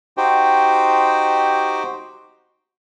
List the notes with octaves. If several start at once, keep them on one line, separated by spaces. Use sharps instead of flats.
D#4 F#4 G4 C5 G5